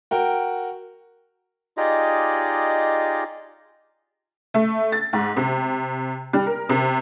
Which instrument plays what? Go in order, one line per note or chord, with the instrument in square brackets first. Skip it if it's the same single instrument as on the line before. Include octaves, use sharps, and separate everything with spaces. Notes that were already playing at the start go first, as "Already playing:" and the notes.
[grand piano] F#4 A#4 G5
[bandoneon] D#4 F4 G4 G#4 D5 D#5
[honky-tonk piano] A3
A6
G#2
C3
G3
A#4
C3